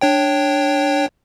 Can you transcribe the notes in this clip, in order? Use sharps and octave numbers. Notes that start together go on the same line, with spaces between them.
D4 C#5 G5